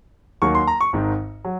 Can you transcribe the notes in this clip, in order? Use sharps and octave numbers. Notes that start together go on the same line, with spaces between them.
D#2 D#3 F#3 A#3 C#6
C6
A#5
C#6
G#1 G#2 D#3
F#3